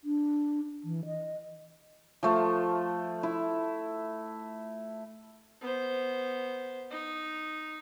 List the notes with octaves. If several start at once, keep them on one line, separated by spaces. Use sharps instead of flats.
D4
E3
D#5
F3 A3
E4
B3 C5
D#4